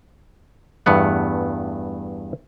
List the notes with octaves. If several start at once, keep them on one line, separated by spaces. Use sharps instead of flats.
E2 G2 A3 B3 F#5